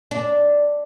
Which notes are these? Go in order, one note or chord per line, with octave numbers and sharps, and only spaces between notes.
D4